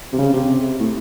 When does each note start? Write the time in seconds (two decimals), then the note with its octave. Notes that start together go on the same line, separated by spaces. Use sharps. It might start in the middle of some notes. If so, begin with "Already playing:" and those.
0.13 C3
0.18 C#3
0.33 C3
0.80 A2